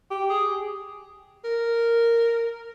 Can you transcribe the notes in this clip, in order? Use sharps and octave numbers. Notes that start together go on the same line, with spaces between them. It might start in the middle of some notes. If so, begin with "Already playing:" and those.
G4
G#4
A#4